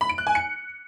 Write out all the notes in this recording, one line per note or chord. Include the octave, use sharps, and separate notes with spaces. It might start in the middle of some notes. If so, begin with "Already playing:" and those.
B5
D7
F#6
G#5
C#7